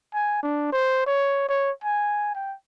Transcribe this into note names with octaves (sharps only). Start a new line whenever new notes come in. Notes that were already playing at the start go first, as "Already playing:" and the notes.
G#5
D4
C5
C#5
C#5
G#5
G5